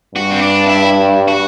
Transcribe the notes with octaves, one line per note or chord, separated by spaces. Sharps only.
G2 F#4
C4
D4
E4
F#4